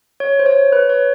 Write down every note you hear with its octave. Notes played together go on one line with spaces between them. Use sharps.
C#5
C5
C#5
B4
C#5